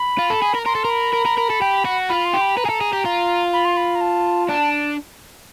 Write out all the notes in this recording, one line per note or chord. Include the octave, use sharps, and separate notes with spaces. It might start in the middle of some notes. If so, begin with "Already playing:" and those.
Already playing: B5
F4
A4
G#4
A#4
A#4 C6
A4
A#4
B5
A#4
A#4
A#4
A4
G4
F#4
F4 B5
C6
G4
B5
B4 A#5
G#4
A4
G#4
G4
F4
B5
C6
B5
A#5
A5
D4 A5